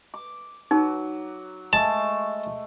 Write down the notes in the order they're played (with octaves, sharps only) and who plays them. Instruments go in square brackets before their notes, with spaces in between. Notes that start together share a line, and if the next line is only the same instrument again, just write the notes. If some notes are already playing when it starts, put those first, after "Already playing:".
[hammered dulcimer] D6
[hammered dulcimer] F#3 [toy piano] D#4
[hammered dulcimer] G#3 A3 [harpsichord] A5